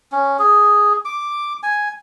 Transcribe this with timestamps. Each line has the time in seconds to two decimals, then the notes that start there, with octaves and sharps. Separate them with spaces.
0.12 C#4
0.39 G#4
1.05 D6
1.63 G#5